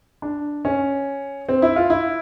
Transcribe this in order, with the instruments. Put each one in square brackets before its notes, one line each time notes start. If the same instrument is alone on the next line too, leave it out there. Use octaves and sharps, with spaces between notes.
[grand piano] D4
C#4
C4
E4
F4
E4